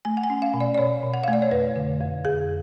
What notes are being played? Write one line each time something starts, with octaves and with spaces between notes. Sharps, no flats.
A3 G#5
F#5
G#5
C#4
F5
B2
D5
D5
B2 C#5
B2
F#5
A3 F5
D5
C#5
F2 B4
D3
F2
F2 G#4